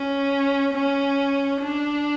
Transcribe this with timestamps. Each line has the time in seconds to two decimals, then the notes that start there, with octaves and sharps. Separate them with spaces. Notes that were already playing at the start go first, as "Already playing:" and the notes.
Already playing: C#4
0.74 C#4
1.61 D4